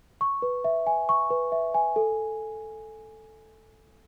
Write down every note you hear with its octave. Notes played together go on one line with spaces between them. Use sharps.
C#6
B4
E5
G#5
C#6
B4
E5
G#5
A4